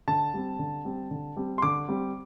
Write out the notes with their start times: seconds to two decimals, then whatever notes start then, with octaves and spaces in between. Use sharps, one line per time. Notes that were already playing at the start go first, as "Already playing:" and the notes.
0.08 D3 A5
0.34 G3 C4
0.59 D3
0.85 G3 C4
1.11 D3
1.37 G3 C4
1.58 C6
1.62 D3 D6
1.89 G3 C4